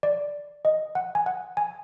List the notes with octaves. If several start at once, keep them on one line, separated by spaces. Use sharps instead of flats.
D5
D#5
F#5
G#5
F#5
G#5